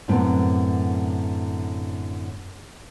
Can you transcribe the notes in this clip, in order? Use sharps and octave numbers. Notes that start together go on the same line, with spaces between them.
F#2 A2 D3 B3 C4